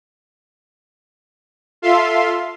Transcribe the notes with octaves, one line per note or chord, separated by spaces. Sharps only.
F4 A4 E5 F5 C6